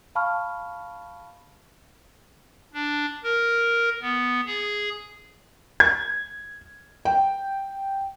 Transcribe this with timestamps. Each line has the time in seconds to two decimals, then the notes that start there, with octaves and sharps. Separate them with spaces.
0.15 F5 A5 B5 C#6 F6
2.74 D4
3.24 A#4
4.02 B3
4.46 G#4
5.80 G#6
7.05 G5